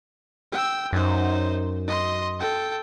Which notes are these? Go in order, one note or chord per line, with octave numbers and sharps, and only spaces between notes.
G5 E6
F#2 D#4 C5
D#5 C6
A4 G5